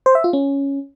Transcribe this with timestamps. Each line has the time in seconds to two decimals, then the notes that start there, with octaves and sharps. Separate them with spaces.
0.06 C5
0.15 E5
0.24 F4
0.33 C#4